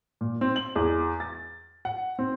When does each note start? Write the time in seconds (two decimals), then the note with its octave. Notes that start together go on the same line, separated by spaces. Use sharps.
0.21 A#2
0.41 C4
0.56 F#7
0.76 E2
1.20 A6
1.85 F#5
2.19 C4